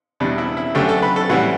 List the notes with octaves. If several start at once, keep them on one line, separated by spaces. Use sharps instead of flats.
E2 B2 G3 D4
E4
E4
F#2 D3 A3 G4
A4
B4
A4
A2 E3 G3 F#4